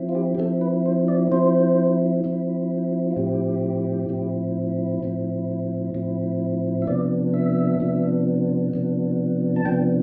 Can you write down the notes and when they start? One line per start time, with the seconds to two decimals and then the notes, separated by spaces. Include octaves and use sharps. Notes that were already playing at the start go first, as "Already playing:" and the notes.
Already playing: F3 C4 E4
0.09 F4
0.15 G4
0.35 G4
0.38 F3 C4 E4 A4
0.61 B4
0.86 C5
1.08 D5
1.31 F3 C4 E4 C5
2.24 F3 C4 E4
3.11 F4
3.16 A2 F3 C4 E4 G4
4.09 A2 F3 C4 E4
5.03 A2 F3 C4 E4
5.94 A2 F3 C4 E4
6.82 E5
6.87 C3 F3 B3 D4 D5
7.34 E5
7.80 C3 F3 B3 D4
8.73 C3 F3 B3 D4
9.56 A5
9.65 C3 F3 B3 D4 G5